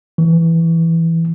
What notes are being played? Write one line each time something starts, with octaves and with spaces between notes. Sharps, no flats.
E3